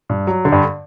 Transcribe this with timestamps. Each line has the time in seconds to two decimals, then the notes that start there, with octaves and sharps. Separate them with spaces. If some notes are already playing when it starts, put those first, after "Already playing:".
0.09 G2
0.27 F#3
0.45 D3
0.52 G2